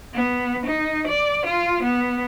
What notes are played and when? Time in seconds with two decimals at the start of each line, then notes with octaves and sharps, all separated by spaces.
0.14 B3
0.66 D#4
1.08 D5
1.46 F4
1.83 B3